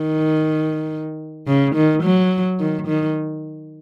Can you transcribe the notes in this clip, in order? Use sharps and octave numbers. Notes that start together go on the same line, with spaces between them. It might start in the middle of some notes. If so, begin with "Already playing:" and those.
Already playing: D#3
C#3
D#3
F#3
D#3
D#3